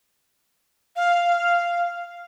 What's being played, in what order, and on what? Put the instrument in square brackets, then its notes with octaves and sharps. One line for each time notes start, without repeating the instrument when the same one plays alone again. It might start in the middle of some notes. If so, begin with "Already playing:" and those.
[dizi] F5